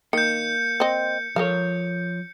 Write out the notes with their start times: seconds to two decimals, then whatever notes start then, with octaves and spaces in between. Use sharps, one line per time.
0.13 D#3 A#3 G6 C#7
0.80 C4 D#5
1.36 F3 A4 A#4 C#5 F5